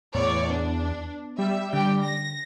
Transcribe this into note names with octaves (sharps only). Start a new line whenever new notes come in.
E2 A2 C#5 D5
B3 D4
G3 E5
D3 G4 G5
A#6